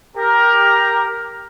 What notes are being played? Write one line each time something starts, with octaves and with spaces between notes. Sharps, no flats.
G4 A#4